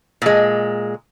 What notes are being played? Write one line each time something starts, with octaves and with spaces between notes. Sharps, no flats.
A#2 G#3